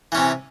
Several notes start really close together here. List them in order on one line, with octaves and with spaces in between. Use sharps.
E3 C#4 C3